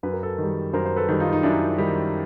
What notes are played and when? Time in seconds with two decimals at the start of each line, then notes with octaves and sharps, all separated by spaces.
0.03 F#2 B4
0.13 A#4
0.23 A4 B4
0.38 D#3 G3
0.73 F#2 A#4 C5
0.86 C5
0.96 A4 B4
1.08 D#3 G3
1.20 D#4 F4
1.33 D#4
1.43 F#2 D4 E4
1.78 D#3 G3